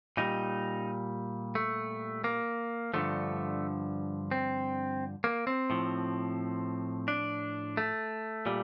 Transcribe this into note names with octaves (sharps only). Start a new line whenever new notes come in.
A#2 G3 D#4
A3
A#3
G2 D3 F3 A3
C4
A#3
C4
A2 F3
D4
A3
A#2 G3